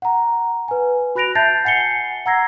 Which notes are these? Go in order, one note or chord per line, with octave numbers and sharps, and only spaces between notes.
F#5 A#5
B4 G#5
F#4 B5 F#6 A#6 D7 F7
E5 A5 G6 A6 C7
F#5 G#5 C7 C#7 G7
F#5 A#5 E6 G#6 A#6 C7